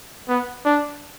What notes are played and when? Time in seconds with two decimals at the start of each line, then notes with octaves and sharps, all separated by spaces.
0.29 B3
0.65 D4